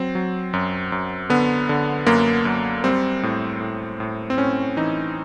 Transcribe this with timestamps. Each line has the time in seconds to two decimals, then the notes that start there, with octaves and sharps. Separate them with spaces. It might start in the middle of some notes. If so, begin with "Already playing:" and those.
Already playing: F#3 C4
0.15 F#3
0.53 F#2
0.92 F#2
1.30 D3 B3
1.69 D3
2.07 F#2 A#3
2.45 F#2
2.84 G3 C4
3.23 A2
3.61 A2
4.00 A2
4.30 C4
4.38 A2 C#4
4.77 E3 D#4